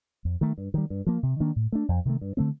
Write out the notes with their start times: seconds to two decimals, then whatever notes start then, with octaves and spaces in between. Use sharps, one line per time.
0.25 F2
0.41 D#3 A3
0.58 G2
0.74 D#3 G3
0.90 G2
1.07 F3 A#3
1.23 C3
1.40 D#3 A#3 D4
1.56 A2
1.72 A3 D4
1.89 F2
2.05 C3 D#3 A3
2.21 G2
2.37 D3 A3 C4